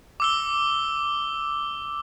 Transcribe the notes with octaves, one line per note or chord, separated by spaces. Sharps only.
D6 E6 G7